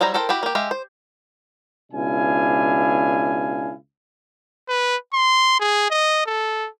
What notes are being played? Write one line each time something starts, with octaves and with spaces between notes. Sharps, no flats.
F#3 G3 E4 C5 A#5
E4 A4 A#4 C5 G5
E4 F#4 G4 B5
A#3 G4
G#3 G4 E5 F5
C5
C#2 B2 D4 E4 F5 G#5
B4
C6
G#4
D#5
A4